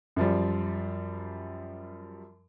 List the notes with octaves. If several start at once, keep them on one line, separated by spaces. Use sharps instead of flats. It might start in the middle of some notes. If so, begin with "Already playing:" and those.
F#2 F3 G3